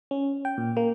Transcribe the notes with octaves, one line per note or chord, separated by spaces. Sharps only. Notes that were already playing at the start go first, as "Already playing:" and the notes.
C#4
G5
A#2
A#3